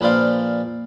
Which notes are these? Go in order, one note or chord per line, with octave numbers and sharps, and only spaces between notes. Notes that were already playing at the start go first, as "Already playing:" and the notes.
A#1 B4 C5 D5 F5